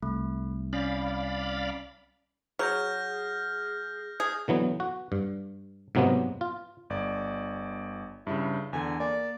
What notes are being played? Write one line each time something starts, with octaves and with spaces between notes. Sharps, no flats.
C2 A3
C#4 D5 F5 B5
F#3 G#4 F6 G6 A#6
G#4 D#6
D3 E3 F#3 B3
F#4
G2
G#2 C3 F#3 G#3 A#3 B3
F4
G1 D5
G2 C#3 E4
E2 D3 G#5
A#3 D5